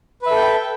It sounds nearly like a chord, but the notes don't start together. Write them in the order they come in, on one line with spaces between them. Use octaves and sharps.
B4 E5 A4 G5